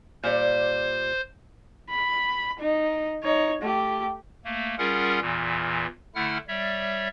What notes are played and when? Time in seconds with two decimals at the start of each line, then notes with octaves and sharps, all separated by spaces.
0.23 A#2 G3 C5 D5
1.89 B5
2.59 D#4
3.23 D#4 C#5
3.61 A3 G4
4.45 A3 A#3
4.78 G3 C#4 F4 G#4 A#4 F#5
5.21 E2 A#2 E3
6.15 D3 A3 E4 F#5 F6
6.48 G3 C#5 D5 E5